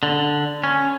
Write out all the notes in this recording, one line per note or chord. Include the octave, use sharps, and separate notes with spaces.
D3
C#4